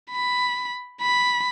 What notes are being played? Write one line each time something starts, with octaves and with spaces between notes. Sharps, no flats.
B5
B5